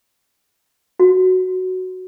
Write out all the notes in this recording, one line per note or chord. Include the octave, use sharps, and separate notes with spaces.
F#4